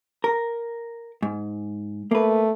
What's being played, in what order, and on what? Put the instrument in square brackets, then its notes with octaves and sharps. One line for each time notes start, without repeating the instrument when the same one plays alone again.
[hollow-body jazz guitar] A#4
G#2
[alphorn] A3 [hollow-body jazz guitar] A#3 B4